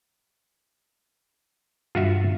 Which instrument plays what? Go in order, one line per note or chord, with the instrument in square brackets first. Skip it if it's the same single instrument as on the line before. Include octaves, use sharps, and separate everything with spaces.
[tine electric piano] G2 [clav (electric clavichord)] F4 F#4 E5